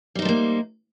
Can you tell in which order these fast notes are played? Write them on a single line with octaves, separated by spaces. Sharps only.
G3 D#4 C5 A3 A#3